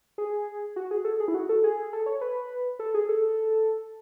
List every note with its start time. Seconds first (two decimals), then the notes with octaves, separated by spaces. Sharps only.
0.18 G#4
0.76 F#4
0.91 G#4
1.05 A4
1.20 G#4
1.28 E4
1.34 F#4
1.49 A4
1.64 G#4
1.93 A4
2.06 C#5
2.21 B4
2.79 A4
2.94 G#4
3.09 A4